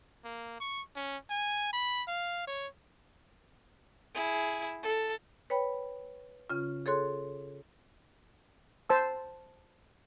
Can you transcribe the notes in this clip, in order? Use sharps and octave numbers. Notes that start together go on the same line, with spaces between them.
A#3
C#6
C#4
G#5
B5
F5
C#5
E4 G#4
A4
B4 C#5 G5 B5
C#3 C#4 F4
G#4 A4 C#5 C6 F#6
C5 A5 E6